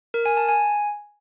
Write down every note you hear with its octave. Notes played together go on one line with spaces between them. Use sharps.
A#4
G#5
A5
G#5